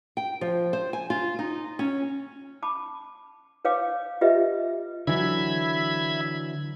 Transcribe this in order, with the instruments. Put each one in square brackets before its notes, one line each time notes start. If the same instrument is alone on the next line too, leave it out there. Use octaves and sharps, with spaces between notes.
[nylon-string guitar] G5
F3
C5
G#5
F4
D#4
C#4
[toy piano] A5 B5 D6
B4 C#5 F5 G5 D6
F4 G4 B4 D#5 E5
[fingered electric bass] D3 E3 F#3 [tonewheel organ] E5 B5 G#6